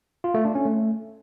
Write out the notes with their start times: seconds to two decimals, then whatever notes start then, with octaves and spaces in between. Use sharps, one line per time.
0.24 F4
0.34 A3
0.45 D4
0.55 C#4
0.65 A3